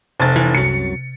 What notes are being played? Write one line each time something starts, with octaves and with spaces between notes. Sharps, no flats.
F1 C3 A6
E3
C2 F#2 F#3 C#7